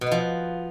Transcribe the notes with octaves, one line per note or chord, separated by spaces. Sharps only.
B2
B3
F3